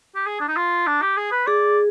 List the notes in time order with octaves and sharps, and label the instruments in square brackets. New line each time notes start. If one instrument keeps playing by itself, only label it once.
[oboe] G4
G#4
D4
D#4
F4
D4
G4
G#4
B4
[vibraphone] G#4 [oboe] D5